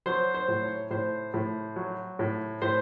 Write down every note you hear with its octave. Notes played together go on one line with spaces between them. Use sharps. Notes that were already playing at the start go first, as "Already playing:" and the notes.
F#3 C5
C5
A2
C#5
A2 C5
A2
F#3
A2
A2 C5